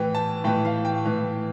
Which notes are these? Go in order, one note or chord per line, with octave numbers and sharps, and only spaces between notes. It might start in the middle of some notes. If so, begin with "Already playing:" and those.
Already playing: A2 E3 G5
A5
A2 E3 G5
F5
G5
A2 E3